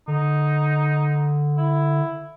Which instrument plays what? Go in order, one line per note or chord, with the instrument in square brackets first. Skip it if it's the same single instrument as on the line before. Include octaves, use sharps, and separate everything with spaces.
[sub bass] D3 [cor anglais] D#4
[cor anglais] E4